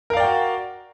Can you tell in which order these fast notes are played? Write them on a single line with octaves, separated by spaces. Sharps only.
A#4 F5 D5 G5 F#4